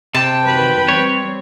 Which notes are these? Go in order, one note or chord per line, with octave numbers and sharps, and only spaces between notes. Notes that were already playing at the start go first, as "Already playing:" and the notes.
C3 G5 A5
D#3 F#4 B4
G3 C4 C#5